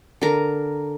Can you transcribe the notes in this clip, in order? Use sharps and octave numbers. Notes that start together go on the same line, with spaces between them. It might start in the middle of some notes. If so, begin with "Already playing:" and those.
D3 A#4